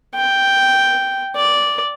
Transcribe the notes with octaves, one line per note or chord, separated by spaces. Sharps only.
G5
D5